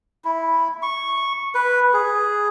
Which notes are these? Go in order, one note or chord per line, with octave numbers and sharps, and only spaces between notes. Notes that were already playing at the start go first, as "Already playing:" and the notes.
E4
C#6
B4
G#4